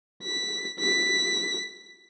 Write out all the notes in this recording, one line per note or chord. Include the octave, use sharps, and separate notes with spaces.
B6
B6